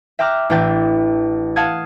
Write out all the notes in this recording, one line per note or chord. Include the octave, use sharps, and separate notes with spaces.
E5 G5 A#5 D6 F6 F#6
A1 E3 D4 G5 A6
F5 F#5 A5 D#6 G#6